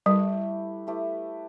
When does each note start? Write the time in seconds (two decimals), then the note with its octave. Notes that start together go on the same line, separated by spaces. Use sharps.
0.06 G3 A3 E4 G4 B4
0.87 A3 E4 G4 B4